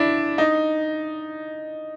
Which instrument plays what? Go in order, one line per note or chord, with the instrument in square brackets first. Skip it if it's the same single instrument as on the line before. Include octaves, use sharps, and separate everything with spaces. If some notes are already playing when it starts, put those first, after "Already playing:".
Already playing: [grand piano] D4 E4
D#4